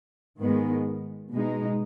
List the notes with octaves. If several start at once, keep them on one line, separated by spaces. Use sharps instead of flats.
G#2 D#3 G#3 B3
B2 G#3 D#4